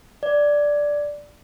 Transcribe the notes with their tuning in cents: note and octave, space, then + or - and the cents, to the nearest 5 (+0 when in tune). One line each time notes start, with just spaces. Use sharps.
D5 -5